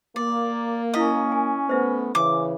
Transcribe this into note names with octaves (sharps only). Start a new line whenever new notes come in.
A#3 D5
C#4 E4 D#5 F5 D#6
G#5
A3 B3 C5 E5
C#3 E3 D6